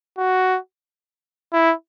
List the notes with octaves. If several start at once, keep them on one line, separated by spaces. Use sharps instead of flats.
F#4
E4